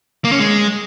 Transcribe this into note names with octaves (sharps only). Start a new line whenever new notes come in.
A#3
C#4
G#3